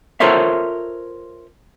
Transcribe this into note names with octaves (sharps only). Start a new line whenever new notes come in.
F4 A4 A#4 C5 C#5 E5